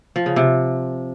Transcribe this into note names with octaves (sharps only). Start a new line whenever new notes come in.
F3
C#3
C3